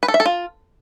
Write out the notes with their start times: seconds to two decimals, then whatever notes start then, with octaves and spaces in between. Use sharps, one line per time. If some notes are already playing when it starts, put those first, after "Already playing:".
0.03 B4
0.08 A4
0.14 E5
0.20 A4
0.25 F4